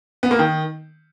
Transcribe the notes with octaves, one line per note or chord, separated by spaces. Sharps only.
B3
A#3
D#3